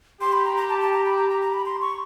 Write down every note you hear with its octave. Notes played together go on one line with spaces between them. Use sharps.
G4 C6
B5
A#5
A#5
A5
A5
A#5
B5
A#5
A#5
A#5
B5
C6
C#6